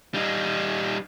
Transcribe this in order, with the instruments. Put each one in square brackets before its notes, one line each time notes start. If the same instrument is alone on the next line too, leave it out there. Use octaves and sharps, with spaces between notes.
[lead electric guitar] G3 D#4